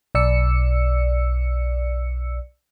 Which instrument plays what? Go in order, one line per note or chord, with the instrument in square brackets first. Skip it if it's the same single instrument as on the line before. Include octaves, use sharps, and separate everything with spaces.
[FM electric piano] B1 D5 E6 C#7